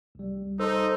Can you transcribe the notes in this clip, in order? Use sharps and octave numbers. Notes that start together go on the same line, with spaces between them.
C2 G3
D#4 A4 C5 A5 C6 E6